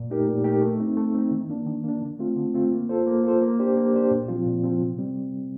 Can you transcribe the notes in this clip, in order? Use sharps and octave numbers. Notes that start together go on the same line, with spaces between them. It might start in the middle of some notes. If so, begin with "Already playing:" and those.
Already playing: A#2
A3 D#4 G4 A#4
A#2
A3 D#4 G4 A#4
A3
C4 D#4
A3
C4 D#4
D#3
A#3 D4
D#3
A#3 D4
D3
A3 C4 F4
D3
A3 C4 F4
A#3
F4 A4 C5
A#3
F4 A4 C5
A#3
D4 G4 C5
A#3
D4 G4 C5
A#2
F3 C4 F4
A#2
F3 C4 F4
C3
G3 C4